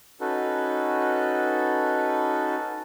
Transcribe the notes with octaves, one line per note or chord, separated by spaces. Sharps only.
C#4 D#4 F#4 A4 B4